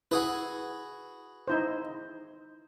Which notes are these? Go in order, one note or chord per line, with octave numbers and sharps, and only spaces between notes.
E4 F#4 G#4 B4
D#4 E4 C5